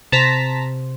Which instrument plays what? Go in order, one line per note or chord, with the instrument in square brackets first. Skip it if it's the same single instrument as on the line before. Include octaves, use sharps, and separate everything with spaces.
[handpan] C3 C5 [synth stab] A5 A#5 B6